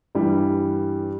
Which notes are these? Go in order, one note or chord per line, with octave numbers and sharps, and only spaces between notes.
G2 E3 G3